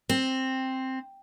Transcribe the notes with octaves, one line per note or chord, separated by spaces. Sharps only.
C4